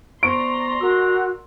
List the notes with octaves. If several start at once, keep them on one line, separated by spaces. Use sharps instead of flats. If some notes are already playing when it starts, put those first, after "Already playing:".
B3 C5 D5 A#5 C6 C#6 D7
F#4 A#4 E6